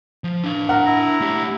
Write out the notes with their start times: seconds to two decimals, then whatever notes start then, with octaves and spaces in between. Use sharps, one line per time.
0.24 F3
0.44 D4 F5
0.69 A#4 F#5
0.86 E4 A#5
1.21 A3 G4